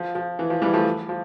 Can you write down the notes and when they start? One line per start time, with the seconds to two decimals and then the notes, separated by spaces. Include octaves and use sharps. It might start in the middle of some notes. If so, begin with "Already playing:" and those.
Already playing: F3
0.15 F3
0.39 E3
0.50 F3
0.62 E3 G3
0.74 F3 A3
1.09 F3